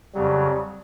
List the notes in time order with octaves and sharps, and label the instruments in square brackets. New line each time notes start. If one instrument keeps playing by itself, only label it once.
[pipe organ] F2 C#3 F#3 [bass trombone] G3